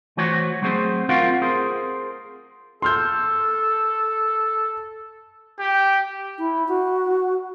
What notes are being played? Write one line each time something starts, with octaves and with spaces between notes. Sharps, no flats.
E3 A3 F#4 C5 C#5
F#3 A3 C4 G#4 C5
C4 C#4 F4 F#4 A#4 F5
G#4 A#4 C5
A4 C6 F6 G6
G4
E4
F#4